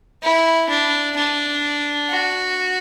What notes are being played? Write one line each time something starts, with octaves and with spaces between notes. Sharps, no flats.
E4
D4
D4
F#4